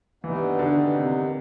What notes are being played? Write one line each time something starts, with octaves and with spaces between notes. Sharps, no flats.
G2 D#3 E3 G3 B3 D#4
D3
C3